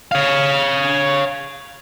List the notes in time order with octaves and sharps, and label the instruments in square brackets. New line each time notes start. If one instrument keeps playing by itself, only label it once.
[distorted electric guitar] C#5 F5